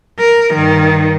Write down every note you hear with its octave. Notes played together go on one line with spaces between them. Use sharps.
A#4
G2 D#3